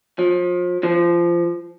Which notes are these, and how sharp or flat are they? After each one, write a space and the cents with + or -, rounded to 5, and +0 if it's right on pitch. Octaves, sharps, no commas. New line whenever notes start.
F3 +30
F3 -20